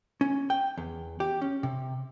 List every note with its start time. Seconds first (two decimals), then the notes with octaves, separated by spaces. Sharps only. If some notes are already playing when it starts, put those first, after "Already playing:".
0.21 C#4
0.50 G5
0.77 E2
1.20 G4
1.42 C#4
1.63 C3